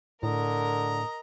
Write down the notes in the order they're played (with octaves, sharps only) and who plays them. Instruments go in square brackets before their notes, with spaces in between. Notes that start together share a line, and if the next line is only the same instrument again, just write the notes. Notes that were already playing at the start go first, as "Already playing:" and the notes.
[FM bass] A2 [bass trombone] D3 [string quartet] A#4 [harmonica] D#5 A#5